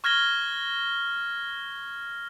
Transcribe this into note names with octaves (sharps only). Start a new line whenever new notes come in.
C#6 F6 G#6 A#6 G7